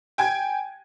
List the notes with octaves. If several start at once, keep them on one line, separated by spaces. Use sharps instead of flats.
G5 G#5 G#6